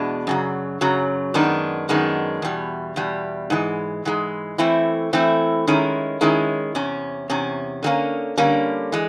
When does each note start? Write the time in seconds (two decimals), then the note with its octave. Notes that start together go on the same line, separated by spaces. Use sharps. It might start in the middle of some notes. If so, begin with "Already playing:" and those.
Already playing: E2 B2 G#3 B3 D4
0.27 F#2 C#3 F#3
0.81 F#2 C#3 F#3
1.34 F#2 D#3 G#3 B3 D4
1.89 F#2 D#3 G#3 B3 D4
2.42 E2 B2 G3
2.96 E2 B2 G3
3.50 G#2 E3 G#3
4.05 G#2 E3 G#3
4.58 E3 A3 C4 E4
5.13 E3 A3 C4 E4
5.67 D#3 G#3 C#4 E4
6.21 D#3 G#3 C#4 E4
6.75 E2 C3 C#4
7.30 E2 C3 C#4
7.83 D3 G3 A#3 C#4
8.37 D3 G3 A#3 C#4
8.92 E3 G#3